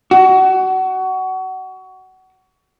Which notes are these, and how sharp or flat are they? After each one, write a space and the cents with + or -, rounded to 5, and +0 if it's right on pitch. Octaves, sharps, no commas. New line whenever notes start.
F#4 +25